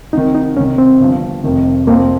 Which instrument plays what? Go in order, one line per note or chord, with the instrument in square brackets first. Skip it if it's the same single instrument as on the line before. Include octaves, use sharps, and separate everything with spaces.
[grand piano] C2 C3 D#3 [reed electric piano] D#4
[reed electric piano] D#4
[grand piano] C2 C3 D#3 [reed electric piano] C#4
[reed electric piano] C4
[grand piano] G1 G2 F3
F1 F2 C3 D#3
[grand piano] F2 C3 F3 C4 [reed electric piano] A#3